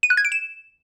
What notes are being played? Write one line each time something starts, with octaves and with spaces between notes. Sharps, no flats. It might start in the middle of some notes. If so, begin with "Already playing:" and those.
D#7
F#6
G#6
D7
E7